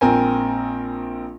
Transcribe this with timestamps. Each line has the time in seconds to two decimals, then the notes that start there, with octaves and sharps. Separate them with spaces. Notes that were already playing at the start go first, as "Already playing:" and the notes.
0.01 A#1 C4 A#4 G#5